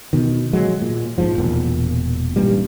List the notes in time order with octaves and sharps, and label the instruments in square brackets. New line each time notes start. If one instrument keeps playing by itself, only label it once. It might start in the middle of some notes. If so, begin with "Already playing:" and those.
[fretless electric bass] B2 D#3
F#3 G#3
A#2
A#1 G#2 F3
E1 A#2
A1 G2 A#2 G3